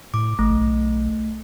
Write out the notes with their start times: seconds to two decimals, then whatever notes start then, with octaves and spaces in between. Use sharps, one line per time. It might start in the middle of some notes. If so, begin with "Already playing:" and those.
0.14 A2 D6
0.39 A1 A3
0.51 B1